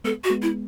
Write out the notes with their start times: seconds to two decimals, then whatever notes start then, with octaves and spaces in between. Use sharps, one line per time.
0.04 G#3 B3 A4
0.24 F#4
0.30 G#3 B3
0.42 E4